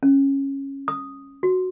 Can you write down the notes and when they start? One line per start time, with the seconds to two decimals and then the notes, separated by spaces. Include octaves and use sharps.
0.03 C#4
0.88 D#6
1.43 F#4